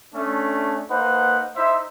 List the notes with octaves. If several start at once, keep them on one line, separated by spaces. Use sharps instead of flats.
A3 C#4 D4
A#3 D#4 B4 C5 F#5
D#4 E4 C5 E5